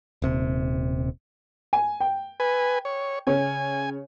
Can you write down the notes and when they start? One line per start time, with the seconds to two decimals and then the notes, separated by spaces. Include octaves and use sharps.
0.22 D#1 C3
1.73 G#5
2.00 G5
2.40 B4 G#5
2.85 C#5
3.27 C#3 C#5 G#5